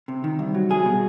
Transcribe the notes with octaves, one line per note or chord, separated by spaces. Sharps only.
C3
D#3
C2
F#3
C2 G#4
B2